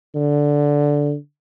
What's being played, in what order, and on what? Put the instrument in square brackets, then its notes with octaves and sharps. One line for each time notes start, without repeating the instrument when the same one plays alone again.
[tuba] D3